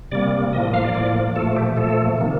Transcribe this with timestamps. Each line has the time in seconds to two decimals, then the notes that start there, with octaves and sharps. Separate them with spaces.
0.11 C3 G3 A#3 D5
0.52 A2 F3 A#3 D#5
0.63 D#5
0.74 F5
0.84 D5
0.94 A2 F3 A#3 D5
1.36 A#2 F3 A3 A4
1.56 G4
1.77 A#2 F3 A3 A4
2.18 C3 D#3 A#3